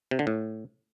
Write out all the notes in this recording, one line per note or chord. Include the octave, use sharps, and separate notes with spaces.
C3
D3
A2